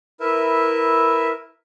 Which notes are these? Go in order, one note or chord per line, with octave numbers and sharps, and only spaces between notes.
E4 A#4 B4 E5